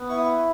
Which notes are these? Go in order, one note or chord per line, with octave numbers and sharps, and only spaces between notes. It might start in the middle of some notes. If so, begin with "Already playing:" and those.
Already playing: B3
E4 C#6
D#6
C#6